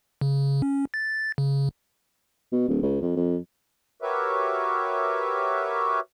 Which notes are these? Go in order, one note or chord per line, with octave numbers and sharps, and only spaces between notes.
C#3
C#4
A6
C#3
B2
D1
C#2
F2
F2
F#4 G4 A#4 B4 C#5 E5